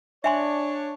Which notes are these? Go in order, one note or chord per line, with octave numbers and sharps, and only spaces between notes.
D4 C#5 E5 G#5 C6